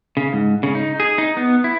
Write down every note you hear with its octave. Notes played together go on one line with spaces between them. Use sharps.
C#3
G#2
C#3
D#4
G#4
D#4
B3
E4